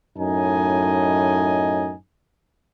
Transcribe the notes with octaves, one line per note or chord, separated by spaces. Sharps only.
F#2 A2 D#4 D#5 G#5